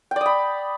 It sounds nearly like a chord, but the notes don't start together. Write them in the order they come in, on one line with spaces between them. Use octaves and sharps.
G5 D5 D#6 B5